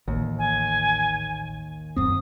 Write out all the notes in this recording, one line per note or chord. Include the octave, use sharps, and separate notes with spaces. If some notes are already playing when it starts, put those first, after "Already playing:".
A1 D#2
G#5
D#1 F#2 C4 D#6